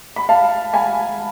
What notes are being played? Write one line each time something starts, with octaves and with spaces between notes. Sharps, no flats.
B5
F5 A5
G#5 B5